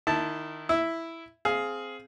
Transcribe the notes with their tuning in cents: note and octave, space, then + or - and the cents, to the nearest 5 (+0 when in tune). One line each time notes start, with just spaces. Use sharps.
D#3 -15 E4 +0 A5 +0
E4 +0 E5 +0
C4 +0 G#4 +15 F5 +0